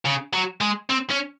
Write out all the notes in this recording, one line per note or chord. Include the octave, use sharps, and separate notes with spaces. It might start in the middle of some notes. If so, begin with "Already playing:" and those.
C#3
F#3
G#3
C4
C#4